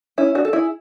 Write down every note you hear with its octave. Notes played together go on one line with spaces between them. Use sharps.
C#4 E4
D4 F#4
A4
E4 G#4